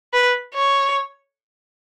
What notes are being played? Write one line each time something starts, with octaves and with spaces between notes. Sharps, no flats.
B4
C#5